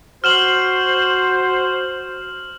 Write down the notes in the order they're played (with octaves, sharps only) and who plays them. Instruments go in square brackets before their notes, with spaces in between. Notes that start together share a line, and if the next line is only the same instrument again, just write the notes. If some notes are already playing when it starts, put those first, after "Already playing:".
[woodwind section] F#4 C5 [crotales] F6 E7 F#7